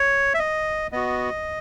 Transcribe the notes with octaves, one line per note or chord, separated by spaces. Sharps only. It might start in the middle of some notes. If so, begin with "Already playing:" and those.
Already playing: C#5
E5
D#5
B3 F#4 D#5